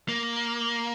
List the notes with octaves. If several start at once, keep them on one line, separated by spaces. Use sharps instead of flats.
A#3